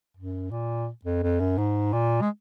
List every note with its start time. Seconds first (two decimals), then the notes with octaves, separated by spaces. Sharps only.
0.17 F#2
0.51 A#2
1.05 F2
1.23 F2
1.40 F#2
1.58 G#2
1.93 A#2
2.22 G#3